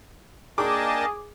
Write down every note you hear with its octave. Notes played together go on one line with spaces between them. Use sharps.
A#3 D4 G#4 A#4 D#5 G5 A5 D6